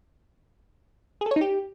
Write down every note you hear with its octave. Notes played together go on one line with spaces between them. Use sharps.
G#4
A4
C#5
D#4
G4